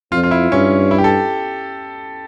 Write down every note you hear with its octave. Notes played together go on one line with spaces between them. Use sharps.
F2 F4
F4
E4
G2 C#4
E4
G4
A4